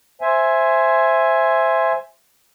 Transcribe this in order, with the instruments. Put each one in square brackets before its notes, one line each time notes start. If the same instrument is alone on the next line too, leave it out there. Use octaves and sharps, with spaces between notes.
[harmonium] C5 E5 G#5